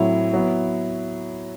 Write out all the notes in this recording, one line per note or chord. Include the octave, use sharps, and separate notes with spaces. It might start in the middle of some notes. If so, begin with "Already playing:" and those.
Already playing: A2 F#3 C4 E4
F#3 B3 E4